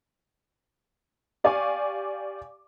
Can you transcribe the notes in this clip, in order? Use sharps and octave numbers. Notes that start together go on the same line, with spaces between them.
G4 D5 F5 G#5 C#6 D6